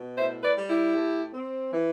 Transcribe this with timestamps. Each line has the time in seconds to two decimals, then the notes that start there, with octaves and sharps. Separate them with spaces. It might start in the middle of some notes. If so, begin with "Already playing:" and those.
Already playing: B2
0.18 A2 C5 E5
0.43 B4 D5
0.56 G3
0.69 E4 G4
0.95 A2
1.33 C4
1.72 E3